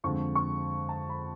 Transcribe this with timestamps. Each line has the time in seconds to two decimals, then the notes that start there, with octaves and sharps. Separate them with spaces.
0.04 F2 D3 G#3 C#6
0.35 C#6
0.89 A5
1.09 B5